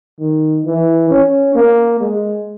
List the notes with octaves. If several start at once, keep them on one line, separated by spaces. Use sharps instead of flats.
D#3
E3
C#4
A#3
G#3